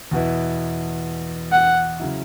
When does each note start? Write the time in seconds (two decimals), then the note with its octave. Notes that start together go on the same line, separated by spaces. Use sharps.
0.11 E2 B2 B3 E4
1.52 F#5
2.00 C#3 F#3 E4